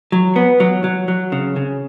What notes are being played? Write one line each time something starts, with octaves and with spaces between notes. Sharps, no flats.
F#3
B3
F#3
F#3
F#3
C#3
C#3